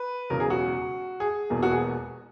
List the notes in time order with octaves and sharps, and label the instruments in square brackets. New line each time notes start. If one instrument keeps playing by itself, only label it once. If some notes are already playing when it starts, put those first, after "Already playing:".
Already playing: [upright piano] B4
E1 E2 C#3 F#3 A#4
G#4
F#4
G#4
E1 E2 B2 A#3
F#4
G#4